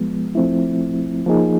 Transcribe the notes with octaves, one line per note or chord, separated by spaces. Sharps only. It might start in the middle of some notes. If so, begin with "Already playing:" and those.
Already playing: F3 G#3 B3
F3 A3 C4 E4
F3 A#3 D#4 G#4